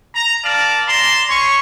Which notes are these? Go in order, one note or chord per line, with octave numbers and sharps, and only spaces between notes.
A#5
A#4 D5 F5 A5
D5 A5 A#5 C6
C#4 C#5 C6 C#6